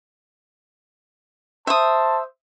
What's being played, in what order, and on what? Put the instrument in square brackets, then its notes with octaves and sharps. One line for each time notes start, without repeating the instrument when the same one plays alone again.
[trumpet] C5 [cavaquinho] E5 D#6 [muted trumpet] A5